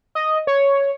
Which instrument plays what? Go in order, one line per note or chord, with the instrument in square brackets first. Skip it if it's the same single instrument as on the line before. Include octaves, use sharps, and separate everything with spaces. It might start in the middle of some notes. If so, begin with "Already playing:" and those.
[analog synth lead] D#5
C#5